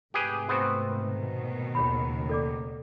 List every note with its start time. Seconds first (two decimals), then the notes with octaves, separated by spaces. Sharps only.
0.14 G#2 C3 A3 G4 G#4 B4
0.49 B3 C4 F#4
0.91 B2 D#3 B4
1.75 A1 D#2 C#3 G#4 C#5 B5
2.29 A4 D5 D6